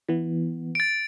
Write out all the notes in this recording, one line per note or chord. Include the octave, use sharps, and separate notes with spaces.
E3 B3
A6 D7